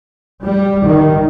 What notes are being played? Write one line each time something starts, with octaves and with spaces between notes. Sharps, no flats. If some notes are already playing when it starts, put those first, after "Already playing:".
G3
D#3